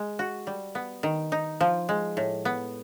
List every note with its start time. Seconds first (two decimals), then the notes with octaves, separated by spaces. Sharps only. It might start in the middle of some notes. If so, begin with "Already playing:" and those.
Already playing: G#3
0.19 F#4
0.47 G3
0.75 B3
1.03 D#3
1.32 D#4
1.60 F3
1.89 G#3
2.17 A2
2.45 B3